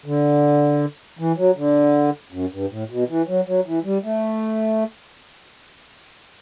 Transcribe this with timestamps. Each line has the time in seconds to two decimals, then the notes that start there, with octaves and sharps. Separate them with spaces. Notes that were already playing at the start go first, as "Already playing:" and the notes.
0.06 D3
1.19 E3
1.38 F#3
1.57 D3
2.33 F#2
2.53 G2
2.71 A2
2.91 B2
3.09 E3
3.28 F#3
3.47 F#3
3.66 E3
3.85 G3
4.04 A3